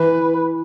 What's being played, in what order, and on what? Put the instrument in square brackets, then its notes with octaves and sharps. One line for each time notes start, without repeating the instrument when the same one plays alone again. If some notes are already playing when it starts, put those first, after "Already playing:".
Already playing: [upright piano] E3 [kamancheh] B4